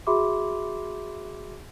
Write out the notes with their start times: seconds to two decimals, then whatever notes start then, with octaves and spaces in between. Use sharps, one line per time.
0.07 F#4 G#4 E5 B5 C6 D6